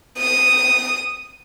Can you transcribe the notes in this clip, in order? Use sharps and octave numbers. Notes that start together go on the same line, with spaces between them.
D#6